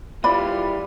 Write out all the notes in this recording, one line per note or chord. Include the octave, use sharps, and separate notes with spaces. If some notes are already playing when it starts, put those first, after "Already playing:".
E3 G3 F4 D5 B5